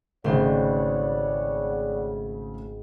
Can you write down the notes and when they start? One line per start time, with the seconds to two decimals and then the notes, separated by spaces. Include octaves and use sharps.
0.24 G#1 C#3 A3 C#5 D5 F#5 C6